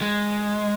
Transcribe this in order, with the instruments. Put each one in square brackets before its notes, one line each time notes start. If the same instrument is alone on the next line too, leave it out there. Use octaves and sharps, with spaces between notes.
[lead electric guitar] G#3